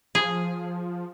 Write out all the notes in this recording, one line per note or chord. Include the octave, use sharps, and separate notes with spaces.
F3 G#4